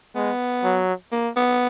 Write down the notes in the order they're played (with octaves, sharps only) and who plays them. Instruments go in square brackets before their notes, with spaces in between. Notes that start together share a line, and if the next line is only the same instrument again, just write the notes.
[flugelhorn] G#3 [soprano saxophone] B3
[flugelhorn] F#3
[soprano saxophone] A#3
B3